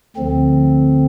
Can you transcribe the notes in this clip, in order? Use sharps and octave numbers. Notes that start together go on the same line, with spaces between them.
D2 D3 F3 C4